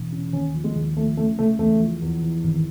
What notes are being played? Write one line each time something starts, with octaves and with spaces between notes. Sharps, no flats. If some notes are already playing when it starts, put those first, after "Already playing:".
Already playing: E1
C#3
D#2 C#4
F3
G#3
D#2
F3 A3
C#3 A3
C#2 A3
E2 A3
F3
E2
E3
G#1